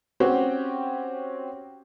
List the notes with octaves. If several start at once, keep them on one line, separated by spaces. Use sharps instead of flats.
C4 C#4 F#4 G4 G5